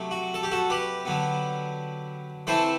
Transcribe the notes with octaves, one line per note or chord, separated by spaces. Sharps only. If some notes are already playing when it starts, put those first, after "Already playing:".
Already playing: C3 F#3 A3
F#4
A4
G4
F#4 A4
G4 B4
D3 F#3 B3
E3 A3 C4 E4 A4 C5